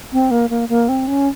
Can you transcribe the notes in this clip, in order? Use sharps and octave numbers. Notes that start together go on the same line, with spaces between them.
C4
A#3
A#3
A#3
C4
C#4